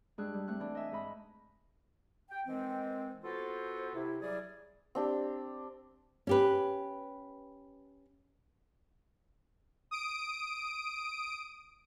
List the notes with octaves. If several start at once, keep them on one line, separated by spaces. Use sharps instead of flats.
G2 G#3 D4 G#4 E6 F#6
G3
A3 C4 F#6
E3 D4
D#5 E5 G#5
G#2 D#5 B5
G5
D#3 E3 G#3 C4
B3 F4 F#4 A4 C5
C3 E4
E3 F#3 G3 G#4 D5
C4 D4 G4
C#4 G4 B4
D#6 D7